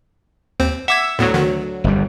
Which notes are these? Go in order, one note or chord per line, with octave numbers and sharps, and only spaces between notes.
D#2 C4 C5
E5 F#5 D6 E6 G#6
D2 A2 F#3 B3
D3 D#3
G1 F2 G3